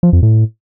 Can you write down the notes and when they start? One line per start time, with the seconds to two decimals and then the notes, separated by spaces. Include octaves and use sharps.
0.03 F3
0.13 F2
0.23 A2